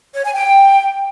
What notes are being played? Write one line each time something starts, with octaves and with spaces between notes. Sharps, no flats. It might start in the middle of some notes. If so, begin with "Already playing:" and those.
C#5
G#5
G5